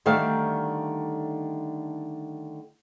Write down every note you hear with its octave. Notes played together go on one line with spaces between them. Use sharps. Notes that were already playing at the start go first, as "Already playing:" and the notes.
D3 D#3 G3 A3 E5 F5